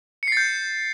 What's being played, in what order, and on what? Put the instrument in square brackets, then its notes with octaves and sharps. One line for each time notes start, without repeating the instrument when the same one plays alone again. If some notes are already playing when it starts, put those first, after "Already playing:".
[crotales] C#7
C7
A6
G6